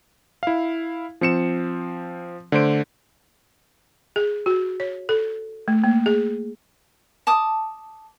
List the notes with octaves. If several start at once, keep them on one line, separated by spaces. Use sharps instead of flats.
E4 F5
F3 C4 C#7 E7
D3 A3 C5 D7
G#4
F#4
C#5
A4
A3
A#3
G#4
A5 D6 D#6